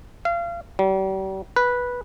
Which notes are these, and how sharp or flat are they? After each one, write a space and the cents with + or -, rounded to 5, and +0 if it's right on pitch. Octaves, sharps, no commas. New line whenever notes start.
F5 -30
G3 -40
B4 -10